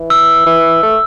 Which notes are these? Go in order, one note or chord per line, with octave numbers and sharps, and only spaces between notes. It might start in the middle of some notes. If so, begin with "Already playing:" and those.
Already playing: E3
E6
E3
A3